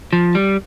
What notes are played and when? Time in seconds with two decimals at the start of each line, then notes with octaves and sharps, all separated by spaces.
0.13 F3
0.35 G3